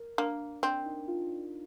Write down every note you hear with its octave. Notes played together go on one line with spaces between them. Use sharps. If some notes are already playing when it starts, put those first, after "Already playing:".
Already playing: A#4
A#3 D4
C4 D4
D#4
F4